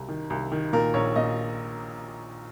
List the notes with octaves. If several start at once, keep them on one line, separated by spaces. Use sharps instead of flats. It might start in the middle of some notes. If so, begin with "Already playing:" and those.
Already playing: C2
D#3
C2
D#3
A#2 A#4
A#1 C#5
A#2 D#5